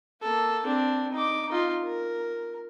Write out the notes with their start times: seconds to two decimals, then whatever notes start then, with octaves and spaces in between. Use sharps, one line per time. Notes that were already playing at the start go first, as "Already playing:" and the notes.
0.22 A#3 A4
0.64 C4 D4
1.12 D#4 D6
1.49 D#4 F4
1.83 A#4